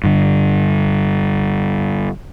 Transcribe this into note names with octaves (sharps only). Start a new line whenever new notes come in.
G2 D3